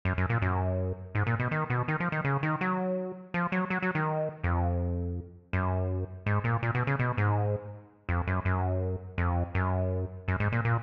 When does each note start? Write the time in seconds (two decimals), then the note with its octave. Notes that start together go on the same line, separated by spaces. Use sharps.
0.05 F#2
0.18 F#2
0.29 A#2
0.42 F#2
1.15 G#2
1.27 A#2
1.39 B2
1.51 D#3
1.70 B2
1.88 D#3
2.00 F3
2.12 D#3
2.24 C#3
2.43 D#3
2.61 F#3
3.34 F3
3.52 F#3
3.70 F#3
3.82 F#3
3.95 D#3
4.44 F2
5.53 F#2
6.26 G#2
6.44 A#2
6.62 A#2
6.75 B2
6.87 C#3
6.99 B2
7.17 G#2
8.09 F2
8.27 F#2
8.45 F#2
9.18 F2
9.55 F#2
10.28 F#2
10.40 G#2
10.52 A#2
10.65 A#2